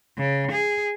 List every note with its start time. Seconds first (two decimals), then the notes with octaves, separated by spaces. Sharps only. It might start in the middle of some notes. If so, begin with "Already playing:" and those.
0.17 C#3
0.51 G#4